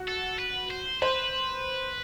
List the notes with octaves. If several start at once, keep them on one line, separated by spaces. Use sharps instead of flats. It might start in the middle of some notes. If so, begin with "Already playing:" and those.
Already playing: F#4
A4
B4
C5
B4 C5